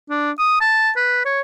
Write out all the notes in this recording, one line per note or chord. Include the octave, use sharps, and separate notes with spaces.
D4
D#6
A5
B4
C#5